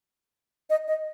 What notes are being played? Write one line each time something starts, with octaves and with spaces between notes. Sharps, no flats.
D#5
D#5